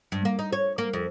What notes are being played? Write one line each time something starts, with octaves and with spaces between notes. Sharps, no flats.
G2
A#3
D#4
C#5
A#3
F2